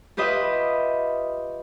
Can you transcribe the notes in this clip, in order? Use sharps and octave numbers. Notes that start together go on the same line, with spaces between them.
F4 G4 B4 D#5 E5